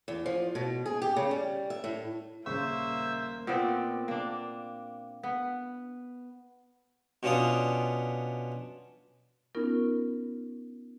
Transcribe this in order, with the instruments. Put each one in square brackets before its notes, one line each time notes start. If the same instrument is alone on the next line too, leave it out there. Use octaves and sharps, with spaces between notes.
[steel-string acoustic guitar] E2
F3
B2
G#4
G4
C#3
G3
E5
A2
[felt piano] D#1 C#3 C#6 [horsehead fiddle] A#3 [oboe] C5 [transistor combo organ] E5
[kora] A#2 B3 C4 D5
A#3 D4
B3
[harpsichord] B2 C#4 D4 F4 D#6
[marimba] B3 C#4 D#4 F4 A#4